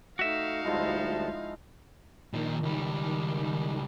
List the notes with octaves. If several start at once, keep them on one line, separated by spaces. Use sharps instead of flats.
A3 D#4 F#4 E5 F5
D2 F3 G3 G#3 E4 A5
A#2 D#3 F3
C#2 G3